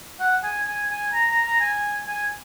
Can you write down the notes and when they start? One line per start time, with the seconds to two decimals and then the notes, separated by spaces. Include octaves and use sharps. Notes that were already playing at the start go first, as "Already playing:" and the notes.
0.20 F#5
0.43 G#5
0.67 G#5
0.90 G#5
1.13 A#5
1.29 A#5
1.45 A#5
1.60 G#5
2.07 G#5